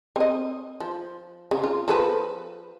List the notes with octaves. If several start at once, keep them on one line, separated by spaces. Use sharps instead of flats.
C4 D#5
F3
C#3
F4
F3 A4 B4